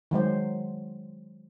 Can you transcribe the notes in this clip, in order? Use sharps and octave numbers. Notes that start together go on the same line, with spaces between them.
D#3 F#3 G#3 C5